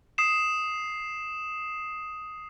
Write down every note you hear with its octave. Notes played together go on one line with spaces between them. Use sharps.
D#6 C7 E7